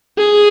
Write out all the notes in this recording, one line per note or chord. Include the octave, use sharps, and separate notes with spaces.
G#4